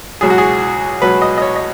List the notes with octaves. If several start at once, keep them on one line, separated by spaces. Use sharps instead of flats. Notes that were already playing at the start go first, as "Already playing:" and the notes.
C#2 B2 F#3 G#4
F#4
G#4
C#2 B2 F#3 B4
D#5
D#5
C#5
D#5